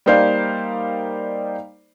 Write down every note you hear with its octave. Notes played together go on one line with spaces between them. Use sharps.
G3 A#3 D#4 C5 D5 F5